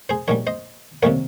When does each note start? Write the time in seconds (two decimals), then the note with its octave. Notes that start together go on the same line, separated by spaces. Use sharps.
0.09 G#4 C5
0.28 A#1 G#2 G3 A#4 C#5
0.47 C5 D#5
1.03 C3 D#3 G3 A#3 A#4 C#5